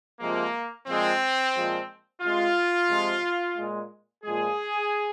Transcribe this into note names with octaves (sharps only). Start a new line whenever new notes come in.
C3 F3 G#3 A#3
A#2 F3 G#3 C4
A#2 F3 G#3
C3 G#3 F4
C3 F3 G#3
A#2 G#3
A#2 F3 G#3 G#4